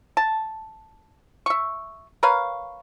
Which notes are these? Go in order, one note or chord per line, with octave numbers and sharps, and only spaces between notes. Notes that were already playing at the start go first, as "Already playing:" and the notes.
A5
E5 C#6
A#4 B4 C#5 F5